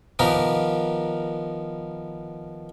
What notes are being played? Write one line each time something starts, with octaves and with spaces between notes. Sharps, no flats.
D#3 F3 B3 G4 A#4